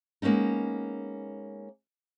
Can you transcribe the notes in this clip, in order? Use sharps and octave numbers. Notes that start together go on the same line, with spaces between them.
G#3 A#3 B3 C#4 D#4